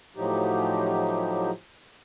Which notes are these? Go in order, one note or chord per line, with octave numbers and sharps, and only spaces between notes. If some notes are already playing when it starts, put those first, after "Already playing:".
A2 F3 F#3 D#4 G4